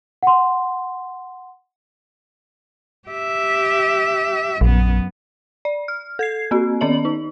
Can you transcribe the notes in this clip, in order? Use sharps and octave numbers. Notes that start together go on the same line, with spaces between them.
F#5 C6
G4 E5
A#1 F#2 B3
D5
F6
A4 G#6 C7
A#3 C4 F#4
D#3 B3 C#4 D5 D#5 F#7
D#4